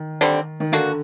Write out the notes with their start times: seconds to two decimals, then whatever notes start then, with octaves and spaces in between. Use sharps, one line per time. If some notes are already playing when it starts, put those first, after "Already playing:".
Already playing: D#3
0.21 D3 G3 C4
0.60 D#3
0.72 D3 A#3 D4 F#4